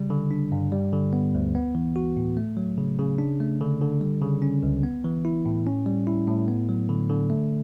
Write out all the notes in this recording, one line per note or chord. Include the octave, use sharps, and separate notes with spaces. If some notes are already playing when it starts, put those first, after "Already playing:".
Already playing: C#3 G3
D3
D4
G2
G3
D3
B3
D2
B3
E3
F#4
A2
A3
F#3
C#3
C#3
D4
A3
D3
D3
G3
C#3
C#4
C#2
B3
E3
E4
A2
C#4
G3
E4
A2
B3
F#3
D3
D3
A3